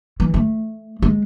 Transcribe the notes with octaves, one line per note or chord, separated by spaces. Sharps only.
E3
A3
G#3